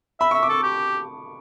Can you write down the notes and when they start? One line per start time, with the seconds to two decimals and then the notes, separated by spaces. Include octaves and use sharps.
0.20 E5 B5
0.31 C#6
0.34 E5
0.43 D6
0.49 A4 C#6
0.63 G4